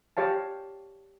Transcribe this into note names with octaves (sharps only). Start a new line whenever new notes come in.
G4 C#5 F5 A5